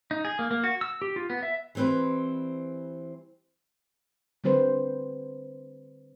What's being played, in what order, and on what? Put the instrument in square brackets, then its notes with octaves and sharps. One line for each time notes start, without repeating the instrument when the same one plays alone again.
[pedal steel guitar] D#4
G#4
A#3
A#3
F#4
E6
G4
F4
B3
E5
[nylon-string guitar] E3 G3 C4 B4 C5
[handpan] D3 G3 C4 B4 C5